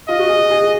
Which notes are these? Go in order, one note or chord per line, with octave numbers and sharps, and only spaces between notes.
F4 D#5
F#4
G#4
G#4